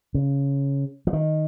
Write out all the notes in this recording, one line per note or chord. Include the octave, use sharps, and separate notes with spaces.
C#3
F3
D#3